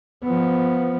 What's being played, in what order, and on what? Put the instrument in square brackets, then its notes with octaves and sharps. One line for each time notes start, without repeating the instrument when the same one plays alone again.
[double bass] F3 B3